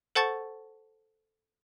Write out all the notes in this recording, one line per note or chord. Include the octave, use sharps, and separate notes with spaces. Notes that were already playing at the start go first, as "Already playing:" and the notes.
A4 C5 F#5 A5 C#6 A6